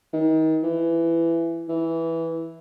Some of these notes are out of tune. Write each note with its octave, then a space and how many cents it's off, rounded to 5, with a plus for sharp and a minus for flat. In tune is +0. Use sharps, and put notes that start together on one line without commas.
D#3 +30
E3 +15
E3 -5